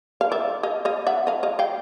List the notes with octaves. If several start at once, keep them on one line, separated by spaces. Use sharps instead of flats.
F5
D5 E5
D#5 F5
D#5 F5
E5 F#5
D#5 F5
D#5 F5
F5 G5